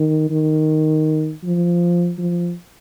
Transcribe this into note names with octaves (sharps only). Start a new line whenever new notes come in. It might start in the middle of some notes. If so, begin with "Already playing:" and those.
Already playing: D#3
D#3
F3
F3